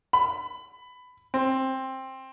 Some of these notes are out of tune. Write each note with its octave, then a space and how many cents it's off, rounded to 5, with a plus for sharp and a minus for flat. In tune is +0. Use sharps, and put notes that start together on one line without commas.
B5 +15
C4 +15